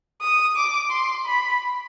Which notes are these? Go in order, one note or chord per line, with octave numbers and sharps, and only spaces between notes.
D#6
D6
C6
B5